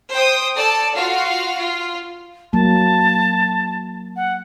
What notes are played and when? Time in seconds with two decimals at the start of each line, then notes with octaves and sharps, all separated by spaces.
0.11 C5 G5 D#6
0.56 A4 D5 A5
0.95 F4 F#4 F5
1.57 F4
2.53 F#3 A#3 A5
4.16 F#5